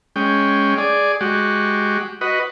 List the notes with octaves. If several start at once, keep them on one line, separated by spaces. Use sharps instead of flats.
G#3 C#4 G5
G#4 D5
G#3 F#4 G4
F#4 B4 D#5